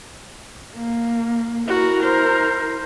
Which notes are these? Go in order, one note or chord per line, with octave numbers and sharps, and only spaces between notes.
A#3
E4 F#4 A#4
C5